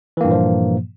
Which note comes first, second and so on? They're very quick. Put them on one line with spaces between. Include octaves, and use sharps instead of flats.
E3 A#3 G2 A#2 F3